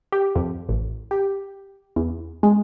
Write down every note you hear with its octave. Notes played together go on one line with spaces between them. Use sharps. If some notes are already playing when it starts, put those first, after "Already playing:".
G4
F2
A1
G4
E2
G#3